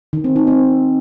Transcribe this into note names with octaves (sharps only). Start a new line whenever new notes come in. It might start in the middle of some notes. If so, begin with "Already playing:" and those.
D#3
C4
D#4
C4